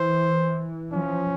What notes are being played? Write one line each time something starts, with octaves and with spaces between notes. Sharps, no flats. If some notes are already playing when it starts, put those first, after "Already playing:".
Already playing: E3 C5
F3 C#4